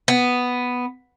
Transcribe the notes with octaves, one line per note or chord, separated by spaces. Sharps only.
B3